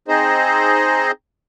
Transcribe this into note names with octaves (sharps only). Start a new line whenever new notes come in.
C4 D#4 G#4 C5 D#5